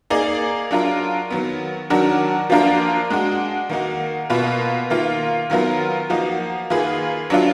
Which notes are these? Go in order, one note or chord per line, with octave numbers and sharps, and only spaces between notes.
A#3 D#4 G#4 D5
F#3 D4 F4 A#4
D#3 F#3 B3
D#3 F#3 D4 F#4 A#4
F3 A#3 D4 F4 A#4
G#3 D4 F#4
D#3 A#3 D#4 F#4
B2 A#3 F4 B4
D#3 A#3 F4
D#3 F#3 B3 F4 A#4
F3 A#3 D#4 F#4
D#3 A#3 F4 G#4 B4
F#3 D4 F4